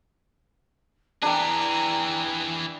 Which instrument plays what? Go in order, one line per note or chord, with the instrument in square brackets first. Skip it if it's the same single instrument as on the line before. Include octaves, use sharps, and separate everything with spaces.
[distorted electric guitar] E3 G#4 [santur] D4 D5 G5 [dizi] A#5